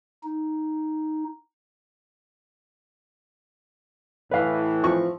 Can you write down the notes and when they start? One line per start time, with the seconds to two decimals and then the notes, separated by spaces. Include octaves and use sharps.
0.23 D#4
4.31 A2 E3 B4 F5
4.83 F3 C4 C#6